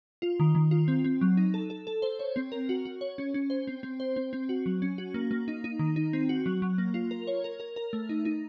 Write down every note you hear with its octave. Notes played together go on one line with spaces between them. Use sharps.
F4
D#3
D#3
F4
C4
C4
F#3
D#4
A4
A4
A4
C5
C#5
C4
A#4
F#4
F#4
C#5
C#4
C#4
C5
C4
C4
C5
C4
C4
F#4
F#3
C#4
F#4
A#3
A#3
D#4
D#4
D#3
D#4
C4
F#4
F#3
F#3
A#3
F4
A#4
C#5
A#4
A#4
A#4
A3
D#4
D#4